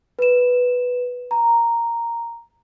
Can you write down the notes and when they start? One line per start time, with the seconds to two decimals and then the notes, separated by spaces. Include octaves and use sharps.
0.19 B4 E7
1.31 A#5